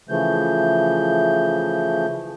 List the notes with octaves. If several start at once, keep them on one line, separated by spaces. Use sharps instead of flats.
C#3 E3 F3 A3 G6